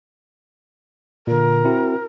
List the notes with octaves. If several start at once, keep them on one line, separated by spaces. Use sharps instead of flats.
A#2 D3 A#4
C4 E4 F#4